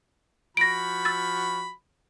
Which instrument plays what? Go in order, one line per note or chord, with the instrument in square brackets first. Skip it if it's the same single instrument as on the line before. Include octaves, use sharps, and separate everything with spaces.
[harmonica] F3 F#4 B5 [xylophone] A#6 D7
[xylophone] E6 A6